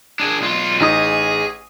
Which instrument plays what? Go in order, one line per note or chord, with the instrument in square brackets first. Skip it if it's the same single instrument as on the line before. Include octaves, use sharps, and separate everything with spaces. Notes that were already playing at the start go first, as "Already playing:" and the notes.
[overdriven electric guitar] D4 G#4
B1 F4
[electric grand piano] A1 D#4 D#6 [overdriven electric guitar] G#4